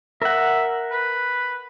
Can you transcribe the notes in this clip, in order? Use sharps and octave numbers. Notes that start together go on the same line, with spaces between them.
A#4 E5 F#5
B4